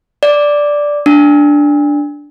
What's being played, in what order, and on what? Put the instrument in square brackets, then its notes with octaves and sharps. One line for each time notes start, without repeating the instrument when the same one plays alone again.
[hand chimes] D5
D4